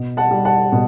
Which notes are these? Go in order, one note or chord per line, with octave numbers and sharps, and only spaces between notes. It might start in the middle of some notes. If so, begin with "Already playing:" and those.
Already playing: B2
F#5 A5
G3
F#5 A5
B2